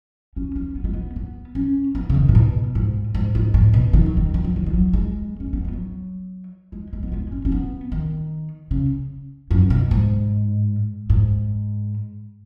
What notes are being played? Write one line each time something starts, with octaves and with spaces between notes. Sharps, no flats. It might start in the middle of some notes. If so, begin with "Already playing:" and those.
C#4
C#4
B3
G#3
B3
B3
C#4
B3
C#3
D#3
G#2
B2
G#2
G#2
G#2
G#2
B2
D#3
F#3
D#3
D#3
F#3
D#3
G#3
F#3
G#3
C#4
B3
G#3
F#3
G#3
G#3
B3
G#3
C#4
C#4
B3
D#3
C#3
F#2
B2
G#2
G#2